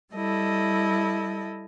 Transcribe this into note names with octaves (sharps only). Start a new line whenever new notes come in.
G3 E4 A4 D#5